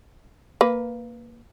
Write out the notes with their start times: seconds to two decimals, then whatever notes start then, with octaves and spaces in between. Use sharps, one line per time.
0.61 A#3 B4